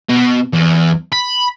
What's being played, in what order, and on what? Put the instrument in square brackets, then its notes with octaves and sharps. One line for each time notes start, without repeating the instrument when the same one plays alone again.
[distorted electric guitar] B2
E2
B5